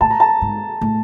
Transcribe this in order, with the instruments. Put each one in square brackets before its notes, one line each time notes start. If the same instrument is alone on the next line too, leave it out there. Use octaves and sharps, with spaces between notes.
[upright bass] A2 [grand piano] A5
[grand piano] A#5
A5
[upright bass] G#2
A2